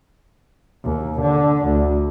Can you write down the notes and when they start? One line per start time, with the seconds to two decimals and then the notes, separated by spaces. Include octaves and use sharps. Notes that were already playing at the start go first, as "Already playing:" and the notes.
0.85 D#2
1.21 D3
1.66 D2